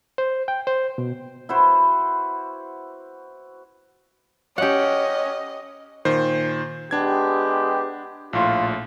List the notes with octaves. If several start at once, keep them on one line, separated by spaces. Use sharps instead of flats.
C5
G5
C5
B2
E4 F#4 B4 C5
C#4 G4 D#5 F#5
A#2 D#3 C5
G#3 B3 D4 G4 G#6
A#1 A2 F4